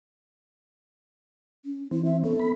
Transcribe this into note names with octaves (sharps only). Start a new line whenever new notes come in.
C#4
E3 C4 E4
E5
B3 C#4 A4
B3 B5